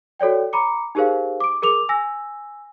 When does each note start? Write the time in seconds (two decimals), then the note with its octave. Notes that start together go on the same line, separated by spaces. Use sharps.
0.20 F#4 A4 C#5 D5 G5
0.53 A#5 B5 D6 C#7
0.95 D#4 G4 G#4 A#4 C5 F5
1.40 D6 D7
1.62 G#4 A#4 D6 F7
1.89 G#5 E6 A#6